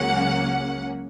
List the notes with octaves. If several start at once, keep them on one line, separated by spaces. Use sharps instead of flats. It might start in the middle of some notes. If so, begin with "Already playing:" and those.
Already playing: C#2 C#3 F#3 A#3 C#4 F#5